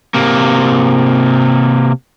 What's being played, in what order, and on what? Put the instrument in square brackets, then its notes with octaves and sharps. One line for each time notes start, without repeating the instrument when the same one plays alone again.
[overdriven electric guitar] C3 A#3